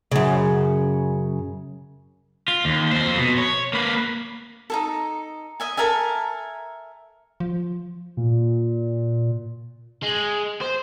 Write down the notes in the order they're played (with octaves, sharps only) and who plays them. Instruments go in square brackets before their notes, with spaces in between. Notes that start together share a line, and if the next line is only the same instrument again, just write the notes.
[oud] F#2 C#3
[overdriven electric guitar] F4
D#2
F2 C5
B2
C#5
A#3 B4
[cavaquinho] D#4 G#4 A4
D#5 E5 G#5
A4 A#4 E5 G#5
[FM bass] F3
[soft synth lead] A#2
[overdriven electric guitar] G#3
C5